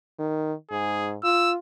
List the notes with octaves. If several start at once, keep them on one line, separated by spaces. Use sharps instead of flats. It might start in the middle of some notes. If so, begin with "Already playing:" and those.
D#3
G#2 G#4
F4 E6